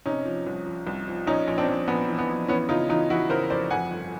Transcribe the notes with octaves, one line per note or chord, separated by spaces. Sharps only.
C3 C#4 D#4
F3
C2
F3
C2
F3
A#1 C#4 D#4
A#1
C4 D4
A#1
A#1 B3
E3
B3
A#1
E3 B3 C#4
C#3 D#4 F4
E3 D#4 F4
E3 E4 F#4
C#3 A#4 C5
F1 C5 D5
F2 F#5 G#5
G1